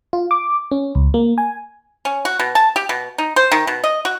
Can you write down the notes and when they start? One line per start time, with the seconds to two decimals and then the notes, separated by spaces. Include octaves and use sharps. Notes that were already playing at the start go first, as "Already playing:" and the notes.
0.13 F4
0.31 D6
0.71 C#4
0.95 C#2
1.14 A#3
1.38 G#5
2.05 C#4
2.25 F#4
2.39 B2
2.55 A5
2.76 G4
2.89 B2
3.18 D#4
3.36 C5
3.52 D#3
3.67 B2
3.84 D#5
4.05 F#4